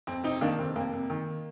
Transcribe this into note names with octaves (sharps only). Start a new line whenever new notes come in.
F2 C4
C3 C4 D#4
D#3 A#3 D4
F1 C4
F2 A#3
C3
D#3